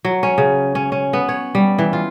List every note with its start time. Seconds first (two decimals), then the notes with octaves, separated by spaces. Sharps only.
0.05 F#3
0.23 C#4
0.38 C#3
0.75 C#4
0.92 C#4
1.13 B3
1.29 C#5
1.55 G3
1.79 E3
1.93 F4